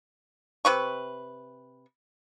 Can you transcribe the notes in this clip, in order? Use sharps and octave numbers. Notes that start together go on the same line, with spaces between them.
C3 B4 C#6